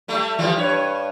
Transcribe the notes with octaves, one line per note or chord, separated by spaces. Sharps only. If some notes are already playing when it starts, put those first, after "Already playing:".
G3 A3
E3 F3 G3
G2 C#5